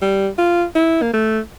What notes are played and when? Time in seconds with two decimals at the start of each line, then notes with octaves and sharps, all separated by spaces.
0.02 G3
0.38 F4
0.76 E4
1.02 A#3
1.13 A3